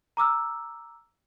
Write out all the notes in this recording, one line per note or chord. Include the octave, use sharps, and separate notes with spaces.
A#5 D6 E6 F6